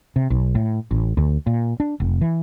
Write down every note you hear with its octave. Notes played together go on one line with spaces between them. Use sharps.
C3
B1
A2
A1
D2
A#2
D4
F1
E3